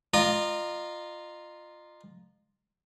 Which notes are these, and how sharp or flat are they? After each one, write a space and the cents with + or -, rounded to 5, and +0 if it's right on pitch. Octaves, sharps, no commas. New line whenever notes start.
F4 +0 D#5 -35 A#5 +0